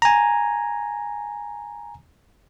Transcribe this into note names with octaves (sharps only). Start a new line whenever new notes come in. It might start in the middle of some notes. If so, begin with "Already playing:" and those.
G#5 A#5